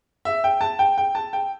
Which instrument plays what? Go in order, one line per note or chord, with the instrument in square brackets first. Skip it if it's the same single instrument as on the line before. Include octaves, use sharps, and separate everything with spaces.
[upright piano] E5
G5
A5
G5
G5
A5
G5